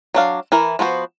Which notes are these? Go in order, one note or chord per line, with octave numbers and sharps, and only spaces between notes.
F#3 D4 F5
E3 E4 A#4
F3 B3 F#4 C5